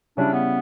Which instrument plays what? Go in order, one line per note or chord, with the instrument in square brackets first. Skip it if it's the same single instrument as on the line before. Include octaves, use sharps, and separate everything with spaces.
[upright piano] C#3 G3 C#4 E4 [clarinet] D4
[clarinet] B3